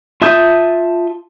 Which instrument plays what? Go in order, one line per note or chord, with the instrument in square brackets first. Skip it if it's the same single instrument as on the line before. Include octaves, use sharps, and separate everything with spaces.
[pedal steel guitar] F4 E5 A5 D#6 G6